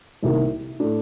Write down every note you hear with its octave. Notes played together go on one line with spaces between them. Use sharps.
C2 C3 D#3 A#3
A2 A3 D4